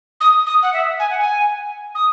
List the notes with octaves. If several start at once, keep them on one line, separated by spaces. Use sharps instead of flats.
D#6
D#6
F#5
E5
G#5
F#5
G#5
D#6